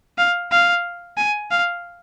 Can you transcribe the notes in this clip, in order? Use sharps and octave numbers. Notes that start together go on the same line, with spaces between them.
F5
F5
G#5
F5